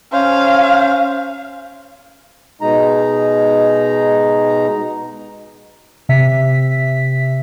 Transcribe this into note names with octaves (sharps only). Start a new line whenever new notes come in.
C#4 C5 F5
B2 G#3 D#4 A#5
C3 E5 B6